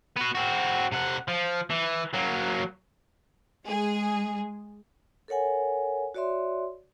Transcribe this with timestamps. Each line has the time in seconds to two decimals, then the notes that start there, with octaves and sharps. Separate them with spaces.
0.17 B3 F#4
0.35 C4 F#4
0.92 C3 F#5
1.28 F3
1.70 E3
2.14 F#3 A#3
3.67 G#3 G#4
5.28 A4 A#4 C#5 F#5 G#5
6.14 F#4 C#5 D5 E5 C6